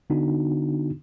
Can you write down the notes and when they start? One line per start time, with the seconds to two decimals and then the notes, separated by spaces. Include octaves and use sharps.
0.10 D3 B3 D4 D#4 F#4